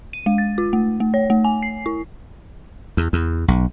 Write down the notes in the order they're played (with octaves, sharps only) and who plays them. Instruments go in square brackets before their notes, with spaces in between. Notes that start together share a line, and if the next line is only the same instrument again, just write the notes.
[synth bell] D#7
G#3
A6
F4
A3
A3
C#5
A3
G#5
C7
E4
[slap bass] E2
E2
B1